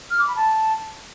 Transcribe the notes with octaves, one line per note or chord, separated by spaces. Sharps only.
F6
D6
B5
A5